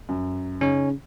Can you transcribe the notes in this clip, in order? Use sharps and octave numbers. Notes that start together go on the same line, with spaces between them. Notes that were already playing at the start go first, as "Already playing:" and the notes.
F#2
C#3 C#4 D#4 C#5